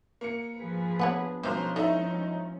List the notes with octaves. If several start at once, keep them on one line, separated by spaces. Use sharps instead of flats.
A#3 C#7
F3 G#4 B4
B3 D4 C#5 F#5 B5
B1 D#3 F3 G#3 C#4 G4 C5 A#5
D#4 E4 A4 D5 E5